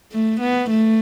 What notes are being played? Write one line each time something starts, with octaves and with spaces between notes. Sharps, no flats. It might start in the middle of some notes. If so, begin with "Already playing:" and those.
A3
B3
A3